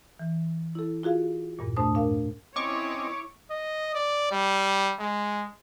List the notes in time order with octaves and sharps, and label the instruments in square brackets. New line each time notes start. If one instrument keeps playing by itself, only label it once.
[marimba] E3
E4 A4
F4 F#4 G#4 F5
E2 G2 A#2
G#2 A3 D4 C5 A5 D#6
D4 A#4 F5
[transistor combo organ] C4 C#4 D#5 [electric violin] E4 C#5 [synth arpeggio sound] C#6 D6
[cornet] D#5
D5
G3
G#3